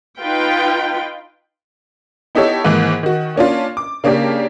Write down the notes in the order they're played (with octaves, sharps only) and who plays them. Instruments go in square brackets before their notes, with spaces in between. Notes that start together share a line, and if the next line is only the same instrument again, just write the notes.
[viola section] D#4 F4 B4 G5
[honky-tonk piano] B3 D#4 E4 G4 A4 C#5
G#2 D#3 E3 A#3
D#3 F#4
A#3 C#4 D4 F4
D6
C#3 A#3 C#4 D4 G4 A#4